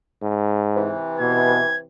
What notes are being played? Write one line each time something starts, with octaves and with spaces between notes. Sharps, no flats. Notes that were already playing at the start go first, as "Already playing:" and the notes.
G#2
C3 E3
B2 G#6